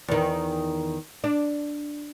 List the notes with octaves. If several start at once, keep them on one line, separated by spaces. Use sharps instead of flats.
E2 D#3
D4